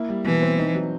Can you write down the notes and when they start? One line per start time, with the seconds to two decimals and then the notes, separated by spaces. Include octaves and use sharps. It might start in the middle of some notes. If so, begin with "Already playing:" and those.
Already playing: A#3 E4
0.09 G3
0.25 B2 E3
0.42 C4
0.58 D#4
0.75 F#3